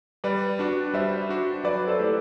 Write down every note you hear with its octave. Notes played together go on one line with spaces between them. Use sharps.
G3 B4 D5
D4 F#4
G3 C5 E5
D4 F#4
F#3 B4 D5
A4 C5
A3 E4 G4